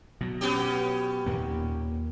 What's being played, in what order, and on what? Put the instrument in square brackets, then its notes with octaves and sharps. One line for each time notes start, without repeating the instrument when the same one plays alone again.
[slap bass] B2 F#3
[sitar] B3 C#4 G4
[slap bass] D#2 A#2 A#3